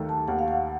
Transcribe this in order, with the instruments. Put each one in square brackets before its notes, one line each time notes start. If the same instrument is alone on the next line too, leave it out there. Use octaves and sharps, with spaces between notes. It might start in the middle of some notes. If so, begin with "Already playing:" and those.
Already playing: [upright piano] D#2 D#3 A3
[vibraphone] A5
[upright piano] D#2 [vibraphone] F#5
[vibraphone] F5
F#5